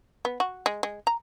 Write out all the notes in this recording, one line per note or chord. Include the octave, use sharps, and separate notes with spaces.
B3
F#4
G#3
G#3
A#5